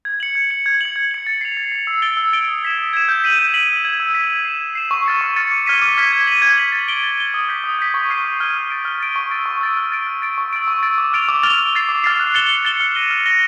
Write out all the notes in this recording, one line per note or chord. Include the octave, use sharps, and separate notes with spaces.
G#6
C#7 F#7
G#6
C#7 F#7
G#6
C#7 F#7
G#6
C#7 F#7
A6
C7 F7
A6
C7 F7
E6
A6 D7 G7
E6
A6 D7 G7
D#6
G#6 B6 E7
D#6
G#6 B6 E7
G6
B6 D#7 F#7
G6
B6 D#7 F#7
E6
G#6 B6
E6
G#6 B6
G#6
C7 E7
G#6
C7 E7
C#6
F6 A6 C#7
C#6
F6 A6 C#7
D6
F6 G#6 B6 D#7
D6
F6 G#6 B6 D#7
G#6
B6 D#7 F#7
G#6
B6 D#7 F#7
A6
D7 G7
A6
D7 G7
D#6
G6 B6
D#6
G6 B6
C#6
F6 G#6 C7 D#7
C#6
F6 G#6 C7 D#7
F6
A6 D7
F6
A6 D7
C#6
E6 A6 D7
C#6
E6 A6 D7
F6
A6 D7
F6
A6 D7
C#6
E6 A6 D7
C#6
E6 A6 D7
D6
F6 A6 D7 F7
D6
F6 A6 D7 F7
D6
F6 A6 C7
D6
F6 A6 C7
F#6
A6 C#7 E7 G7
F#6
A6 C#7 E7 G7
F6
A#6 D#7 G7
F6
A#6 D#7 G7